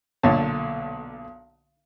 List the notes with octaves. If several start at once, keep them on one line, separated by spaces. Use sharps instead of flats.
B1 A#2 D3 C#5 A5